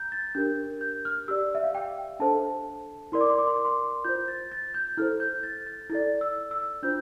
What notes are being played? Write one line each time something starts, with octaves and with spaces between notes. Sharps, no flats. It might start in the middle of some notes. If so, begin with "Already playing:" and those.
Already playing: A#5 G6
A6
D4 G4 A#4 G6
G6
F6
G4 D5 E6
E5
F5
G5
D4 A4 C5 A5
E4 A#4 D5 C6
D6
C6
D6
C6
D6
C6
F4 C5 G6
A6
A6
G6
E4 A4 C5 F6
G6
A6
A6
E4 A4 D5 A6
E6
E6
D4 F4 C5 G6